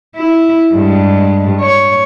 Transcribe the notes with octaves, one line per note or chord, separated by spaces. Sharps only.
E4
G2 G#3
C#5